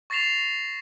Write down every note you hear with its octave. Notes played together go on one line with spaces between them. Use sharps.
C#6 A6 A#6 C7 E7 F7